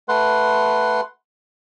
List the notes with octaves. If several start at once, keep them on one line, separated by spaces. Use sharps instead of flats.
A3 B4 F#5 C6